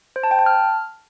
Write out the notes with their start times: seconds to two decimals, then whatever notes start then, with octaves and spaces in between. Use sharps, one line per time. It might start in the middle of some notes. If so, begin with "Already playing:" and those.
0.16 C5
0.23 A5
0.31 G5
0.39 A5
0.46 F6